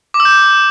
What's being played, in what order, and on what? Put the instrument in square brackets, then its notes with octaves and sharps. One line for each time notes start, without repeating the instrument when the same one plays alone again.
[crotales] D6
E6
G6